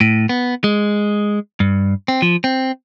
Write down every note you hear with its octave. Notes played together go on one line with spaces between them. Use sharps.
A2
B3
G#3
G2
C4
F3
C4